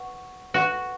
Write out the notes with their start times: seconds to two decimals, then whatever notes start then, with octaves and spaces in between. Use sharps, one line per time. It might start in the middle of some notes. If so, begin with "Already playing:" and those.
Already playing: B4 F#5 C#6
0.54 F#4 B4 F#5 C#6